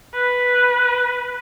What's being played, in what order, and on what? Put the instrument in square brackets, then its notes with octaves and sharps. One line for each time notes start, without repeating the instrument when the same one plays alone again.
[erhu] B4